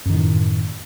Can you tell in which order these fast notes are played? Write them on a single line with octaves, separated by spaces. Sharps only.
F#2 D#3 A2